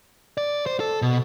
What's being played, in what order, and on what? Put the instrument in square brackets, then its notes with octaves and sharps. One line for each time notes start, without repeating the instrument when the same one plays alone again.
[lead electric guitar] D5
C5
A4
B2